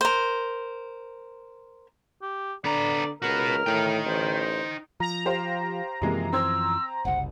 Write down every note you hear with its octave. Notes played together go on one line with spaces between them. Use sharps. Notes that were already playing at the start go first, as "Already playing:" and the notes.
A#4 C5
G4
D3 B3 D5 A#5
C#2 B3 F#4 A#4
A2 D#4 G5
A1 C5
F3 A#5
G4 C5 F5
F#2 C3 E3 F3 G#3 A#3
C4 C6 E6 G#6
F#1 C2 F#5